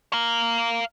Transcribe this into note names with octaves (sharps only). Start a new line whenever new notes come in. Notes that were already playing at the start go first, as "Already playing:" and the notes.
F5 A#5